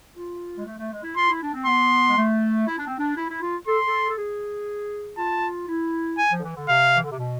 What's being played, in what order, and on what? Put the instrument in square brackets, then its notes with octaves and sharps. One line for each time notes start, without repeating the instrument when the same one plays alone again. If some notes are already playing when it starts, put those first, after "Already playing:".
[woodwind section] F4
G#3
A3
A3
G#3
E4
[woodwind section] F4 [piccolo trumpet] C6
[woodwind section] E4
D4
C4
[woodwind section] B3 [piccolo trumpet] C6
[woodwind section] G#3
A3
E4
D4
C4
D4
E4
E4
F4
[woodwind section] A4 [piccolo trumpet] C6
[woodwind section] A4
A4
G#4
[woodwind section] F4 [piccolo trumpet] A5
[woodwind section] E4
[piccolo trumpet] G#5
[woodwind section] F3
D3
E3
D3
[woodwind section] C3 [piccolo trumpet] F5
[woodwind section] E3
D3
C3
B2